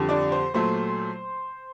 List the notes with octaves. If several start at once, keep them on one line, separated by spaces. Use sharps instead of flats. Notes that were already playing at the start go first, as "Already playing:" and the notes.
Already playing: F2 D3 G3
D4 D5
C5
A#2 F#3 A3 C5